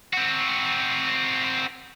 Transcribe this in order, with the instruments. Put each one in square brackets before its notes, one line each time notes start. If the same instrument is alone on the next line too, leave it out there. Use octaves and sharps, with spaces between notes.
[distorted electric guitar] C4 F#4